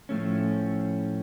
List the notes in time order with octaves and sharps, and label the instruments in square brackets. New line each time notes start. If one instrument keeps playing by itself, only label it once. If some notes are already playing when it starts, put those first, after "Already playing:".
[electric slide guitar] A2 F3 A3 C#4